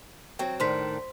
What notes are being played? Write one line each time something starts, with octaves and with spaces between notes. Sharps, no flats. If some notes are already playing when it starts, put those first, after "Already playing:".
F#3 C4 G5
A2 D#3 D4 C5 C6 B6